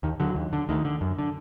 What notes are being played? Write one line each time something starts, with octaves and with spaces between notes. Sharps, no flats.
D#2 D#3
D3 F#3
D#2
D3
D2 D#3
D3
F#2
D3